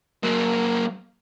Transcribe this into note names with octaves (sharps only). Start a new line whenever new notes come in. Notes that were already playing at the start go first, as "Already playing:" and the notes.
F#3 A#3